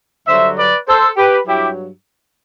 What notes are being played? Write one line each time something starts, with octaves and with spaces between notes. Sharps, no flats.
G2 D3 F#3 C5 E5
B4 D5
A4 C5
G4 B4
G2 F#3 E4 G4